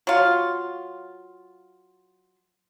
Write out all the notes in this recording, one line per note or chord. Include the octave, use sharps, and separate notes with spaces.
F#3 F4